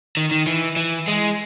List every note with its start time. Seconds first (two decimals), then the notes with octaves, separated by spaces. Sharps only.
0.17 D#3
0.31 D#3
0.47 E3
0.76 E3
1.08 G#3